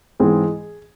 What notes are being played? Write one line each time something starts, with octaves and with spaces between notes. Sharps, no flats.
G#2 E3 G#3 C4 G#4